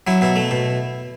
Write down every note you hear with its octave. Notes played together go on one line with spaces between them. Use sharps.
F#3 E4
B2 E4
A3
B2